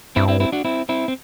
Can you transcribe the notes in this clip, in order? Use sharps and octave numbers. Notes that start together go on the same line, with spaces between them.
G2 C4 E4
C4 E4
C4 E4
D4 F#4
C4 E4
C4 E4
C4